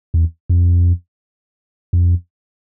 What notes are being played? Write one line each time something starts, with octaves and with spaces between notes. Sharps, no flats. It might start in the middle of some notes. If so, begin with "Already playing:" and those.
E2
F2
F2